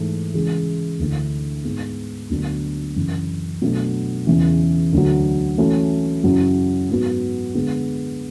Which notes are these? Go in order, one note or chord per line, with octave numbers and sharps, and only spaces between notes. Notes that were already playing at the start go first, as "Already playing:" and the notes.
Already playing: G#2 E3 A3
C#3 E3 G#3
D2 D3 A3 E4
G#2 G#3 B3
D2 D3 F#3 B3 D4
F#2 C#3 E3
B2 F#3 A3 D4 F#4
E2 C#3 E3
D2 D3 F#3
E3 A3 C#4 F#4
F#2 C#3 F#3 C#4 E4
G#2 F#3 B3 F#4
D3 G#3 B3